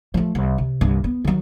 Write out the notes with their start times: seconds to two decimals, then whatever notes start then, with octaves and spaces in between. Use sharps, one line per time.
0.14 F3 A3
0.35 C2
0.58 C3
0.81 C2 G2
1.04 B3
1.25 D#3 F#3